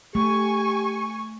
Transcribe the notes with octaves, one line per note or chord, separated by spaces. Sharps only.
A3 G4 G#5 C#6